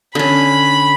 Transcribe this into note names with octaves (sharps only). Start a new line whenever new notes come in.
D3 C#4 B5